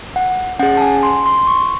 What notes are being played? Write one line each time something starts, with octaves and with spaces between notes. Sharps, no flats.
F#5
C#4 G#4 F#5
A5
G#5
C6
C6
C#6